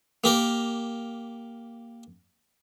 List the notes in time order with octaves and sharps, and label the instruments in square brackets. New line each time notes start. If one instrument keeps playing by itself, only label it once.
[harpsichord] A#3 G4 A#4